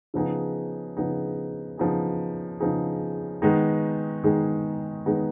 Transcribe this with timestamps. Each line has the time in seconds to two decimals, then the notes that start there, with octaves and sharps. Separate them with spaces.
0.14 C#3 F3 B3 D#4 G#4
0.97 C#3 F3 B3 D#4 G#4
1.77 C#3 F3 B3 D#4 G#4
2.60 C#3 F3 B3 D#4 G#4
3.42 D#3 G#3 B3 D#4 G#4
4.24 D#3 G#3 B3 D#4 G#4
5.06 D#3 G#3 B3 D#4 G#4